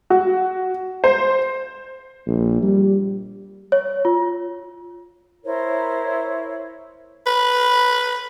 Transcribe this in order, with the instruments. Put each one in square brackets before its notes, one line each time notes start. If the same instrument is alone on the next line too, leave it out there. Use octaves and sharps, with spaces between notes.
[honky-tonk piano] F#4
C5
[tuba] A#1
G3
[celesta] C#5
F4
[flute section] E4 A#4 C5 C#5
[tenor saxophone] B4